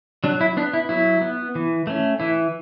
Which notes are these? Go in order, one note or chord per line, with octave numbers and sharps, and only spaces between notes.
F#3 D4
E4
B3 D4
E4
F#3 E4
B3
E3
A3 C#4
E3 E4